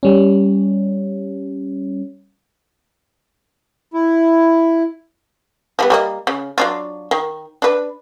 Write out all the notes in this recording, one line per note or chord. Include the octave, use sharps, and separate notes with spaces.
G3 C#4
E4
F3 G3 B3
G3 A#3 D#5
C#3
F#3 D4 F4
D#3
D4 B4